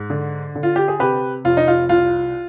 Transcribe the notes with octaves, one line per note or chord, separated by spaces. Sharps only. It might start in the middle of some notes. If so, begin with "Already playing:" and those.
Already playing: G#2
D3
D3
F4
G4
G#4
C3 G4 B4
F1 F4
D#4
F4
C2 F4